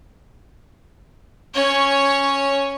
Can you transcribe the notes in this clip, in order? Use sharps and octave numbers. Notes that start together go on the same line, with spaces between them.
C#4 C#5